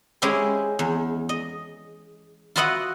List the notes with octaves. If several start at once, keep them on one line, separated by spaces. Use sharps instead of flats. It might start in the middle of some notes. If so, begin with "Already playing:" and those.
G#3 C#4 E4 G4 C5
E2
D#5
F4 F#4 B4 D#5 E5 F#5